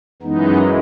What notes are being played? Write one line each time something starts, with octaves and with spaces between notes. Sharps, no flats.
F#2 E3 G#3 B3 D#4